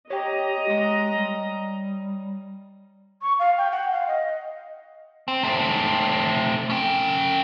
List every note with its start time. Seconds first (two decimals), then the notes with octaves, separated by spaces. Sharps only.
0.10 G4 C#5 D#5 G5 A#5
0.68 G#3
1.15 G3
3.22 C#6
3.39 F5
3.58 G5
3.72 F#5
3.91 F5
4.08 D#5
5.28 C4
5.43 A3 C4
6.70 C#4 G5